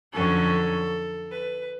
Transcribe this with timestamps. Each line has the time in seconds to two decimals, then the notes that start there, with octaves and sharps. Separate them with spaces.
0.14 F2 D3 F#3 C#4 A4
1.31 B4